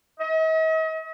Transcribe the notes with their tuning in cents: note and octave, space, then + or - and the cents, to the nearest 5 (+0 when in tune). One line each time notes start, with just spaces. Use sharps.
D#5 +45